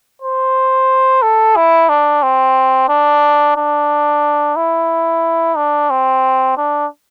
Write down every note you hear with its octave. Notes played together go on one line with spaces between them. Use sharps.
C5
A4
E4
D4
C4
D4
D4
E4
D4
C4
D4